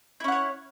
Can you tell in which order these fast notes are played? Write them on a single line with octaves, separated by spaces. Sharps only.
E4 C#4 F#5 C#5